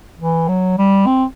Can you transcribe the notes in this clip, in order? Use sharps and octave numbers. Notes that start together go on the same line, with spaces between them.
E3
F#3
G3
C4